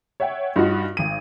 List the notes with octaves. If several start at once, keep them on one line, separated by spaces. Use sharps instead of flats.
C#5 E5 F#5 G5
G2 D#4 F4 F#4
G#1 D#7